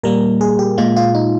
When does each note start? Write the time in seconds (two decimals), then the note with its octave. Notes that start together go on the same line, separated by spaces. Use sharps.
0.03 A#2 G3 A#3 A#4
0.41 G#4
0.59 G4
0.78 A#2 G#3 F4
0.96 F4
1.15 D#4